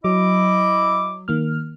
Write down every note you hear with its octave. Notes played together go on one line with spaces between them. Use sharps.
F#3 E4 D#5 D6
D#3 A#3 F6